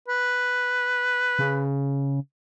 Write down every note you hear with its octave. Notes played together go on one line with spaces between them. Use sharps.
B4
C#3